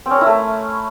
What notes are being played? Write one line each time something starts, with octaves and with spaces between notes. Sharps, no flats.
C4
C#4
A#4
E4
A3